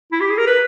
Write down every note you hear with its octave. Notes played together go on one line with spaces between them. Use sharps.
E4
G4
G#4
A#4
B4